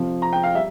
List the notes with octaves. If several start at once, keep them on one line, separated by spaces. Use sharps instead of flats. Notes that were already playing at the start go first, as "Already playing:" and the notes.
Already playing: F2 C3 F3
A#5
G5
F5
G3 E5